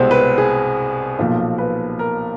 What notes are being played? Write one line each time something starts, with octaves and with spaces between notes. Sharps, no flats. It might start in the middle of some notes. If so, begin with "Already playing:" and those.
Already playing: C2 B2 G#3 C4 C5
B4
G#4
B1 A#2 F3 C5
B4
A#4